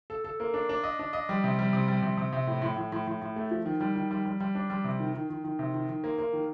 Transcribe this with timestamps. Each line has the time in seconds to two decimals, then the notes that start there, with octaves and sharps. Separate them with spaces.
0.10 A4
0.24 A4
0.40 A#3
0.54 D4
0.69 D4
0.83 D#5
0.99 D4
1.13 D#5
1.29 G3
1.44 C3
1.59 G3
1.73 C3
1.88 G3
2.02 C3
2.17 C3
2.33 C3
2.47 A2
2.62 A2
2.77 A2
2.92 A2
3.07 A2
3.21 A2
3.36 A3
3.51 F3
3.65 D#3
3.80 G3
3.95 D#3
4.11 G3
4.26 G3
4.40 G3
4.55 D4
4.70 G3
4.84 C3
4.99 D#3
5.14 D#3
5.30 D#3
5.44 D#3
5.59 C3
5.74 D#3
5.88 D#3
6.04 A#3
6.18 A#3
6.33 D#3